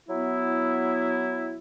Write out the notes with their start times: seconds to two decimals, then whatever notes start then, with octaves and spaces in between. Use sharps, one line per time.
0.08 F#3 B3 E4